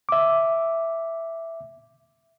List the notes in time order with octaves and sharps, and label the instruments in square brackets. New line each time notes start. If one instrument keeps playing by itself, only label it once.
[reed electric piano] E5 D6